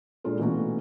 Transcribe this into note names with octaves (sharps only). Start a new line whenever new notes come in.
A#2 G#3 D4 F4 A4
B2 E3 A3 A#3 C#4 F#4